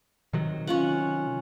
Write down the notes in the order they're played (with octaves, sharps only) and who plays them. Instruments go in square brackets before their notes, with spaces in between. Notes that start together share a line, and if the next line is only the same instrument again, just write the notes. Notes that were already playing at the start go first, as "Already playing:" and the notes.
[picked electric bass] C3 D#3 F#3
[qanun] C#4 F4 F#5